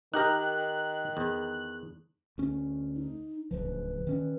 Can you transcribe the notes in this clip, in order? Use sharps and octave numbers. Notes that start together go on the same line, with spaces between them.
D#3 D#4 G4 A#4 F#6
E2
D2 C#4
D#4
D1 C#2 F3 B4
D#3 C#4